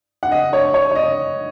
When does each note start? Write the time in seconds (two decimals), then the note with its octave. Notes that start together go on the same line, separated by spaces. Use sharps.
0.23 F#5
0.31 D#5
0.53 C#5
0.74 C#5
0.91 C#5
0.95 D#5